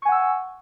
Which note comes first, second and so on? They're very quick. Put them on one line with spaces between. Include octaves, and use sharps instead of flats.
C#6 G#5 F#5 E6